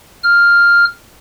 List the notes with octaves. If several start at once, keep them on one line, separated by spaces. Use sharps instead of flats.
F6